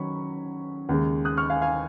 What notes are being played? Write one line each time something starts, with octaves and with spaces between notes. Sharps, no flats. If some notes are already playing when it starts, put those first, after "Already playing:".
Already playing: D#3 F#3 C#4 B5 C#6
D#2 C#3 G#3
D#6 F#6
C#6 F6
F5 G#5
F5 G#5